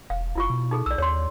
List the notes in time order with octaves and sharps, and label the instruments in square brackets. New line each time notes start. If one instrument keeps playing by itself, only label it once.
[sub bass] E1 [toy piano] F5
[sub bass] F#1 [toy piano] E4 F4 C#6
[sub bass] B2
[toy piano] D#4 G#4 A4
[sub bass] B1 [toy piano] D5 E6
[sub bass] D#2 [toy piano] C#5 C6